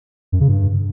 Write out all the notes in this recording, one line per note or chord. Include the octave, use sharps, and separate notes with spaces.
F#2
C#3
G2